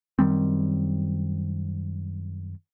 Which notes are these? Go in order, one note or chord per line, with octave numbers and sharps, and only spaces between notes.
F#2 D#3 G3 C4